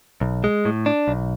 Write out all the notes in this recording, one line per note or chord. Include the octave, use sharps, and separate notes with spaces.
B1
G#3
A2
D4
B1